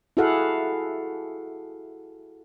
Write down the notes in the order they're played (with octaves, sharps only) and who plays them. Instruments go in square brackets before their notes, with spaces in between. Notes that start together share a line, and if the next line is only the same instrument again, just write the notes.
[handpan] E4 F#4 G#4 A4 F5 F#5